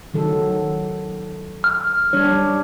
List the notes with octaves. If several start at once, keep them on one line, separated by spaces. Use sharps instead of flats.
D#3 F#3 A4
F6
G3 D4 C#5